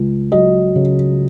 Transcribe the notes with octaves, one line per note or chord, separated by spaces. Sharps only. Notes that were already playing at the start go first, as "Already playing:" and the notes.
Already playing: C#2
F#3 D#5
C#3